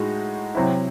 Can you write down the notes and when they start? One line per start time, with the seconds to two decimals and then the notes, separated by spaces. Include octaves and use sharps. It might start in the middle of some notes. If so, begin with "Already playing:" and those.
Already playing: A2 G#3 D#4 F#4
0.55 C3 F#3 C4 E4